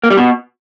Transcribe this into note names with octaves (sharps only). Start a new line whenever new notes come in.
A#3
G3
B2